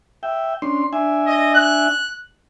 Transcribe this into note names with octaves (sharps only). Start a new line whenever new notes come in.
E5 G5
C#4 D4 C6
D4 E5 G#5
D#5
F#6